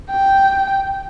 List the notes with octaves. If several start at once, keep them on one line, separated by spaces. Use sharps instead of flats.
G5